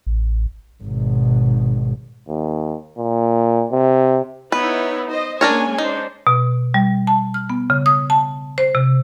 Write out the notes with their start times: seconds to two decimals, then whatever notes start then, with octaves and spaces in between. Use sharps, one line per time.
0.07 A1
0.84 G#1 B2
2.28 D#2
2.98 A#2
3.72 C3
4.52 B3 D#4 E4 B4 C#5
5.10 C5 D#5
5.41 G#3 A#3 C#4 D4 A#4 C#5 G#5
5.78 D4 D#4 C5
6.27 B2
6.74 G3
7.07 A5
7.34 F6
7.50 B3
7.70 C#3
7.86 D#6
8.10 A5
8.58 C5
8.75 C3